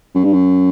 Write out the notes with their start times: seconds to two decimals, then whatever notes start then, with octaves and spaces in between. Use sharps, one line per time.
0.15 F#2
0.24 G2
0.33 F#2